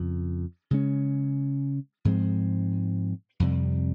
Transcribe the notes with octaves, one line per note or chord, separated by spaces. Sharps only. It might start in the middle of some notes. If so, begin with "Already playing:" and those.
Already playing: F2 C#3
C#3 G#3 C#4
G#2 F3 G#3 C4
F2 C3 G3